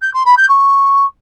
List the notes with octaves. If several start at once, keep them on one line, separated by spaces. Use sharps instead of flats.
G6
C6
B5
G6
C#6